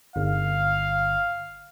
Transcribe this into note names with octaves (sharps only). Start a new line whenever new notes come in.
G1 F5